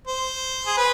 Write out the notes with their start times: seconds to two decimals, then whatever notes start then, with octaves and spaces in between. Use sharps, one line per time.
0.07 C5
0.66 G#4
0.77 B4